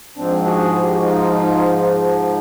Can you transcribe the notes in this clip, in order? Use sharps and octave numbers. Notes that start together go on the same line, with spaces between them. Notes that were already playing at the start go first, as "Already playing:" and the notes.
G#2 F3 C4 D4
F#4 G#4
G4
F#4
D#4 F4
D#4 F4